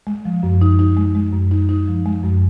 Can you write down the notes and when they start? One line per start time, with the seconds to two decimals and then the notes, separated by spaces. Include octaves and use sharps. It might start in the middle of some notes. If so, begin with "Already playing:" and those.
0.07 G#3
0.25 F3
0.43 F#2
0.61 D#4
0.79 D#4
0.97 G#3
1.15 G#3
1.33 F#2
1.51 D#4
1.69 D#4
1.88 F3
2.06 G#3
2.24 F#2